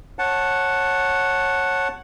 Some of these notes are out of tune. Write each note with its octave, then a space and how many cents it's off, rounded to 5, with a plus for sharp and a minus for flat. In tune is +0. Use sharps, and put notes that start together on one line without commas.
C#5 -15 F#5 +0 A5 +0